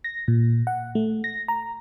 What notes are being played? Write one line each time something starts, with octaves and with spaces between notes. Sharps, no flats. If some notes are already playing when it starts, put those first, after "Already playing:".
A#6
A#2
F#5
A3
A#6
A#5